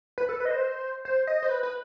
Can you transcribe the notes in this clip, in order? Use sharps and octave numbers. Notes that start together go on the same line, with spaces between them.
B4
A4
B4
D#5
C5
C5
D#5
C5
B4
B4